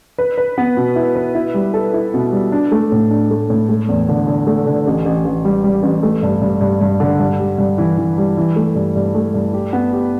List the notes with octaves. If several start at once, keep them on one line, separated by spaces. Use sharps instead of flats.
B4
B4
B3
B2
E4
B4
E4
G3
A4
E4
B2
G3
D4
A3
A2
D4
A3
A2
A3
E2
D3
D3
A3
D3
A1
A1
A1
G3
G3
A1
A3
G2
G2
G2
G2
D3
G2
G3
G2
E3
E3
G3
E3
A3
G2
G2
A3
G2
G4
B3
G4